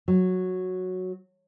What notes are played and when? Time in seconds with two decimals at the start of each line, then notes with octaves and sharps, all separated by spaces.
0.08 F#3